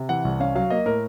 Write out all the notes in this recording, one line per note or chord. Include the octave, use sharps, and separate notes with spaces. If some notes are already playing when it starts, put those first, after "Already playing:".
Already playing: C3
E3 F#5
C2
C#4 F5
F#3 F5
A#3 D#5
A2 A#4